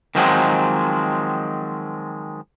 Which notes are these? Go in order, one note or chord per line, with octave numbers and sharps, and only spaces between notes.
D#3 F3 F#3 G#3 C4